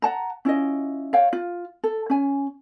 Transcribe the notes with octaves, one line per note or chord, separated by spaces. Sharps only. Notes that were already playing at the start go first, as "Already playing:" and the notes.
F#5 A5 A#5
C#4 E4 F4 D#5
C#5 F5 G5
F4
A4
C#4 G#5